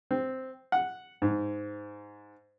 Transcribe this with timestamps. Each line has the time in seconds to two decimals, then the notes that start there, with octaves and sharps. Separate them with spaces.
0.11 C4
0.72 F#5
1.22 G#2